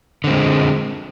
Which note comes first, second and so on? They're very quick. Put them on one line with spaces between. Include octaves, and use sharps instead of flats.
D3 C4 G#3